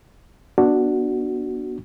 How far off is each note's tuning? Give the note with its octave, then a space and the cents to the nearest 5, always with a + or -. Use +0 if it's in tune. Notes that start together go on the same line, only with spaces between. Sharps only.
B3 -25 D4 +5 F#4 +0